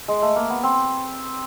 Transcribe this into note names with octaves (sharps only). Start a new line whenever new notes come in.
G#3
A3
A#3
B3
C4